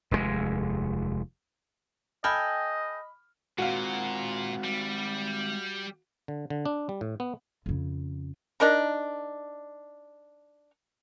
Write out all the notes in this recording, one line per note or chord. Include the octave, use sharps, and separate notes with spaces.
F1 D#2 A2 G#3
A4 D#5 G5 G#5 B5 F6
A#2 G#3 C4 F#4 F5
G3
D3
D3
D4
G3
A2
B3
F2 C#3
D4 D#4 A#4 A#5